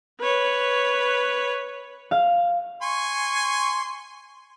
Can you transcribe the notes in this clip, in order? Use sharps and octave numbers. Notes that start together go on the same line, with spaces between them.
B4 C#5
F5
G#5 C6 C#6